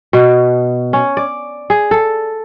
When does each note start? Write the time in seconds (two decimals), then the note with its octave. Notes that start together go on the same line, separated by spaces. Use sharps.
0.13 B2
0.93 C#4
1.17 D5
1.70 G#4
1.91 A4